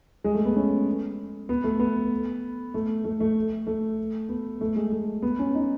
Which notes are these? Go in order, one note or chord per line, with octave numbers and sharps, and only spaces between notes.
G#3
A3
B3
C#4
B3
A3
B3
A3
A3
A3
A3
B3
A3
G#3
A3
B3
C#4
D#4